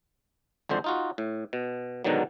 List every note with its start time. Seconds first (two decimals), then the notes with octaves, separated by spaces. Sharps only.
0.69 G#1 F2 D3 C5
0.84 D#4 F4 F#4
1.18 A2
1.53 B2
2.04 G#2 B2 D3 D#3 F#3